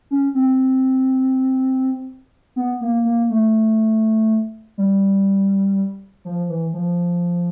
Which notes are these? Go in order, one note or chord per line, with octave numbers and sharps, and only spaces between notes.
C#4
C4
B3
A#3
A#3
A3
G3
F3
E3
F3